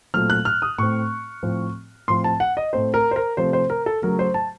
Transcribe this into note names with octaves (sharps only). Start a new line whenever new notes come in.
A#2 F#3 A3 C4 F6
F#6
F6
D#6
A2 A3 C4 C#6
A2 F3 C4
A2 F3 C4 C6
A5
F#5
D#5
A2 A3 C4 C5
A#4
C5
A#4
C3 F3 A3 C4 C5
C5
A#4
A4
C#3 F#3 A3 A#4
C5
A5